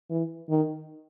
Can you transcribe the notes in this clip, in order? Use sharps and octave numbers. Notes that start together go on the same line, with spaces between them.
E3
D#3